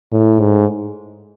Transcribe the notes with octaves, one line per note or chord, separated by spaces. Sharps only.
A2
G#2